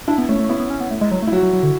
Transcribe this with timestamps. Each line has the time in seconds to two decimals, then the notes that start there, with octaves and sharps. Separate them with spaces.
0.08 D4 E4
0.18 B3
0.29 A3 C#4
0.39 A3
0.49 B3 E4
0.60 B3
0.70 C#4
0.80 B3
0.91 A3
1.01 G#3
1.11 F#3
1.22 A3
1.27 E4
1.32 F#3 F#4
1.43 F#3
1.53 F#3
1.63 D3